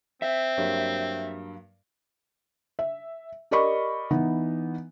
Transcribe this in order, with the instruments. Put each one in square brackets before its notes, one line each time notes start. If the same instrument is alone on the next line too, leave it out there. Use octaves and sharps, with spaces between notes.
[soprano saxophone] C4 [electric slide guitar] E5
[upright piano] G2 F#3 A#3
[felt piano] E5
G4 A#4 D5 D#5 B5 C#6
E3 B3 D#4